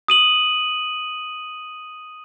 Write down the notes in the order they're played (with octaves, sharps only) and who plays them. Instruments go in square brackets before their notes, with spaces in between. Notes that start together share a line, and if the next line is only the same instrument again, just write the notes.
[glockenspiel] D#6 D#7 F#7